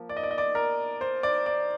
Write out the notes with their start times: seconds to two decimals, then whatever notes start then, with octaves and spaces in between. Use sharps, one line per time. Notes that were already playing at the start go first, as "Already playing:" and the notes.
Already playing: F3 A#3
0.09 D5
0.17 D#5
0.23 D5
0.31 D#5
0.38 D5
0.55 A#4
1.01 C5
1.23 D5
1.46 D5